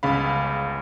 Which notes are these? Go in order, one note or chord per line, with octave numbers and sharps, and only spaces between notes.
G1 C#2 C#3 F5 B5